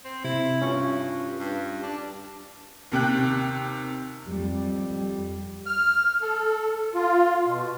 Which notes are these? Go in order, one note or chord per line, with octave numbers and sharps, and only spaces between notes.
C4
C3 E4
G2 C#4 F4 C#6
G2
D4
D#2 C3 G5 F#6
F2 G3
F6
A4
F4
B2